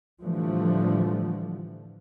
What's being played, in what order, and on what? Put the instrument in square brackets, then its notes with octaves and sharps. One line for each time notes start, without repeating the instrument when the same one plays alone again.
[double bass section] A2 D3 E3 F3 G3 A3